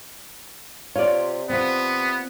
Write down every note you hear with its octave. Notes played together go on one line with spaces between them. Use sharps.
C3 F4 C#5 D5
C3 B3 C4 F4